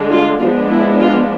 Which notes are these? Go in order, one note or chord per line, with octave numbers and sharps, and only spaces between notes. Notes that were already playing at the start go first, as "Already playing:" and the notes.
Already playing: D3 G#3 D4
F4
F3 G#3 B3 D4 F4
E4
F4